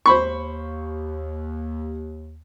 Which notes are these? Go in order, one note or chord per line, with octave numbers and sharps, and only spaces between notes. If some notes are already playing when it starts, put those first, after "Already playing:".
D#2 C5 B5 C#6